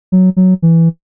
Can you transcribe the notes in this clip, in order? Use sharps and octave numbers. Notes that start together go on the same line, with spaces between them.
F#3
F#3
E3